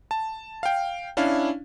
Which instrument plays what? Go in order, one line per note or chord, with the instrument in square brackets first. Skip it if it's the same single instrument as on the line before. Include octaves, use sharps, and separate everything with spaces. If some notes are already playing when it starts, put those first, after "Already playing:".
[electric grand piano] A5
F5 G5
C#4 D4 E4 F5